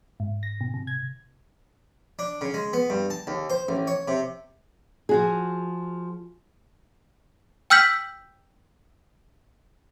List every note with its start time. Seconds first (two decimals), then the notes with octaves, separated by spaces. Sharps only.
0.20 G#2
0.43 A#6
0.61 B2
0.74 C3
0.87 G#6
2.19 D4
2.41 C#3
2.54 G#3
2.73 B3
2.90 G2
3.10 A5
3.27 D#2
3.50 C5
3.68 A1
3.87 C#5
4.08 C3
5.09 F3 F#4 G#4
7.70 G5 E6 F6 G6 B6 F#7